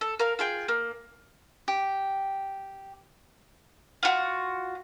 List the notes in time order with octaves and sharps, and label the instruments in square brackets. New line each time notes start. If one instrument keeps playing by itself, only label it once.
[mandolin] A4
A#4 F5
F4 G#4 G5
A#3
[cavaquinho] G4
[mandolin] F4 F#4